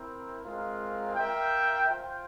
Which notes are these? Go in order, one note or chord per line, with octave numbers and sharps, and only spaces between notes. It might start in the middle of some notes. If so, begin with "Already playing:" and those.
Already playing: C4 E4 A#4
G#3 C4 F4 A#4 F5
F4 A#4 E5 G5
F4 C5 G5